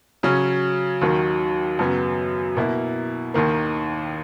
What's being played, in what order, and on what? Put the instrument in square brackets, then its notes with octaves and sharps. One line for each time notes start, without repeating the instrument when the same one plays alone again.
[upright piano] C#3 F#3 C#4
D#2 D#3 F#3 A#3
F#2 C#3 F#3 B3
B2 A#3 E4
D#2 D#3 A#3